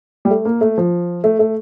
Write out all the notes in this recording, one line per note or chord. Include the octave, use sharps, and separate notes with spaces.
G3
A3
A#3
A3
F3
A3
A3